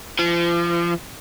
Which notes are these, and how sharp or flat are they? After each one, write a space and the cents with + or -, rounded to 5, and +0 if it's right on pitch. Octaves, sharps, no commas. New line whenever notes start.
F3 -35